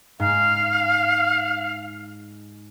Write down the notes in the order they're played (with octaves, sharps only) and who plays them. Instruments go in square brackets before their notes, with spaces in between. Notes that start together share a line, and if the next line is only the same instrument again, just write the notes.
[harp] G#2 [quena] F5